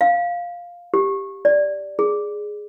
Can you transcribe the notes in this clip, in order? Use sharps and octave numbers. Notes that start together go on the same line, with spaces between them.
F5
G4
D5
G#4